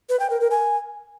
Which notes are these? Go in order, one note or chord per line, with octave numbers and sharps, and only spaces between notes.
B4
G5
A#4
A#4
G#5